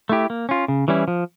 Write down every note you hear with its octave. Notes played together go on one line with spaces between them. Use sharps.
A3 E4 G4
A#3
C#4 F4
C#3
E3 G3 C#4 E4
F3